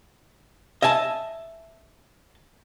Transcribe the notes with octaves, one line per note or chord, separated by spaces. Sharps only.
D#5 E5 G#5 A5